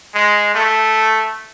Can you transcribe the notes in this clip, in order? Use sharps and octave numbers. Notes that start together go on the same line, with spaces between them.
G#3
A3